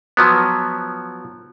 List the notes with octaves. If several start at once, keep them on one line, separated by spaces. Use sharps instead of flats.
F3 F#3 B3